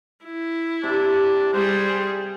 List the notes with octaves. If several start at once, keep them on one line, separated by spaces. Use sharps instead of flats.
E4
C3 D4
G3 G#4 C5